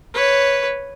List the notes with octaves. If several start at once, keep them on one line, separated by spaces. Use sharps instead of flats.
B4 C#5